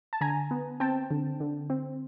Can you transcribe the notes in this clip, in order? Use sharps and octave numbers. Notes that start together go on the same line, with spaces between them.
A5
D3 G#5 A#5
B3
C4 G5 A5
D3
D3
C4